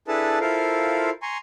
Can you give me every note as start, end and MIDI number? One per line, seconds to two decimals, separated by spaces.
0.08 0.39 62
0.08 0.39 64
0.08 0.39 68
0.08 0.39 69
0.08 0.39 71
0.08 0.39 81
0.41 1.10 64
0.41 1.10 65
0.41 1.10 69
0.41 1.10 70
0.41 1.10 72
0.41 1.10 77
1.22 1.38 80
1.22 1.38 82
1.22 1.38 84
1.22 1.38 85